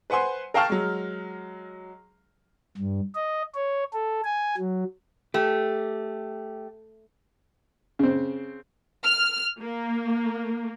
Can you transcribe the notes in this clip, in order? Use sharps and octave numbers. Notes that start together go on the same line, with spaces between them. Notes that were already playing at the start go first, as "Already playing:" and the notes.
B4 C5 F#5 G#5 C6
A#4 F5 G5 A5 C#6 F6
F#3 G#3
G2
D#5
C#5
A4
G#5
F#3
A3 G4
C#3 C4
F6
A#3